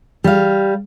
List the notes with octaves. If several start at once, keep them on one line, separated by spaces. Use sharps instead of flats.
G3 F5